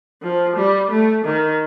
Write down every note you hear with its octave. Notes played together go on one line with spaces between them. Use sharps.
F3
G3
A3
D#3